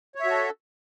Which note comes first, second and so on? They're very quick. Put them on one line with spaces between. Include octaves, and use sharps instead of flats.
C#5 E5 F#4 A4